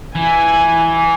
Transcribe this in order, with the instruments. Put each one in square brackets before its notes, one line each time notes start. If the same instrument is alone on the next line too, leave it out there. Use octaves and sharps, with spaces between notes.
[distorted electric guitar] E3 [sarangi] G#5